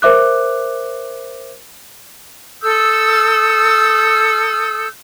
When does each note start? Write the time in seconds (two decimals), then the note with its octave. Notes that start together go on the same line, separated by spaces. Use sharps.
0.02 A#4 C5 E5 D6 F#6
2.62 A4 D#6 E6 G6